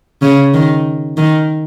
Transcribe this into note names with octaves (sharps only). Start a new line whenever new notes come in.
C#3
D#3
D#3